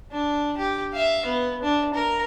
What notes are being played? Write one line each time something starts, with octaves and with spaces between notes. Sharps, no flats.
D4
G4
E5 F5
B3
D4
A#4